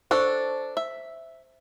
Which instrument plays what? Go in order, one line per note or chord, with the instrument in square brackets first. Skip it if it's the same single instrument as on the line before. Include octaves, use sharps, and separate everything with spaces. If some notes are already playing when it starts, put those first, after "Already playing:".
[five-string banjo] D4 A4 [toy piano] C5 C#6
[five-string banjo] E5